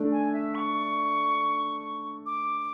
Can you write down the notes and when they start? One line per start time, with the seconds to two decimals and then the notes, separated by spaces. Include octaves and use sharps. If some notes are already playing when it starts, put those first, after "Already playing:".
Already playing: A3 D4 A4
0.12 G#5
0.33 E5
0.55 C#6
2.26 D6